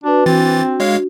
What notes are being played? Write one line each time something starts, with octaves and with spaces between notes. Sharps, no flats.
D4 F#4 B4
E3 C4 D4 F#4 A6
G#3 C#5 F5